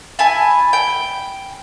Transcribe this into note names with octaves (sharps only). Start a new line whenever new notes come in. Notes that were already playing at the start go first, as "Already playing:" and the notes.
E4 G#5 A5
G5